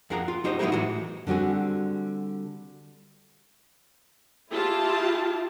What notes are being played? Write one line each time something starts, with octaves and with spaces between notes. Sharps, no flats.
F2 G#4 A#4 F#5 A#5
F4
F#3 D#4 G4 C5 D#5
F#3 G#3 B3 E4 G4 A#4
A2 E3 G#3 F#4
D3 G3 C4 F#4 G#4
E4 F4 G4 G#4 A5